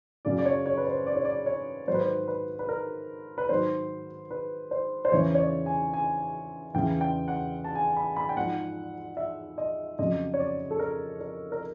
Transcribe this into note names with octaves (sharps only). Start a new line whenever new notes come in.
F#2 C#3 F#3 D5
D5
C#5
C#5
B4
C5
D5
C#5
D5
C#5
G#2 D#3 F#3 C5
B4
C5
B4
B4
A#4
B4
G#2 D#3 F#3 C5
B4
C5
C5
E2 C#3 E3 C#5
C#5
D5
G#5
G#5
E2 C#3 E3 G5
G5
F#5
A5
G#5
B5
B5
G5
G#2 F3 F#5
E5
D#5
F2 C#3 F#3 D#5
C#5
D5
A4
A#4
A#4
A#4